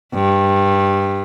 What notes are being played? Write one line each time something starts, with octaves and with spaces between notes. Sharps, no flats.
G2